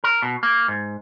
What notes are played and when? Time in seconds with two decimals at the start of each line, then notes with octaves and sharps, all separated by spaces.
0.04 A#4
0.22 B2
0.43 A#3
0.68 G#2